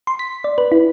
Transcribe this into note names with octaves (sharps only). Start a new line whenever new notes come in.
C6
B6
D5
B4
E4